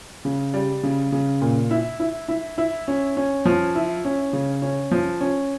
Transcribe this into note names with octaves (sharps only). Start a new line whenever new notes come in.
C#3
G3
C#3
C#3
A#2
E4
E4
E4
E4
C#4
C#4
F3
E4
C#4
C#3
C#4
F3
C#4